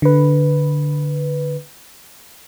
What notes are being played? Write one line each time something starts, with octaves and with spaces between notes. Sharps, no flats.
D3 B4